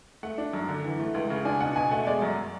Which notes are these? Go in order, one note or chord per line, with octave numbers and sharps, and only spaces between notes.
A3 F#5
D4
F#2
D3
E3
A3
C#2
C#3
D4 G#5
B2 F#5
B2 G#5
A3 F#5
G#3 D5
F#2